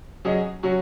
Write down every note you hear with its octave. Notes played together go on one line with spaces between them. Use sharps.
F#3 C#4 G#4 D#5
F#3 C#4 F#4